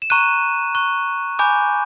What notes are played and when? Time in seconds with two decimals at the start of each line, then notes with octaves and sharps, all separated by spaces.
0.02 E7
0.10 A#5 C#6 F#6 D#7
0.75 A#5 C#6 F#6
1.39 G#5 B5 D6 G6